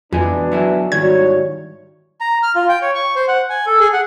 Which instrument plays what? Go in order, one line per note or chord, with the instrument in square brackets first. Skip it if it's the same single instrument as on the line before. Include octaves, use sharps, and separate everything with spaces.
[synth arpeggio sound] F2 [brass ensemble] B2 B3 D4 [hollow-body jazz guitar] E3 G#3 G#4
[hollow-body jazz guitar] F#3 E4 G#4
[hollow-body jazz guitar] G#2 D#3 G3 [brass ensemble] E4 C#5 [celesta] F#4 D5 [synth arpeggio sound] G#6
[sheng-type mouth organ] A#5
F6
F4
G5
C#5
C#6
C5
F#5
G#5
A4
G#4
F#5